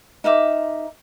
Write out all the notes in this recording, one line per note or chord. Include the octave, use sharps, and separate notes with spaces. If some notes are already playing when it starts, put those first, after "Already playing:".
D#4 A#4 E5 D6